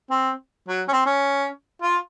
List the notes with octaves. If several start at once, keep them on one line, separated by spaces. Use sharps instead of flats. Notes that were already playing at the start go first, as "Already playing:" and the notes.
C4
F#3
C#4
C4
C#4
F4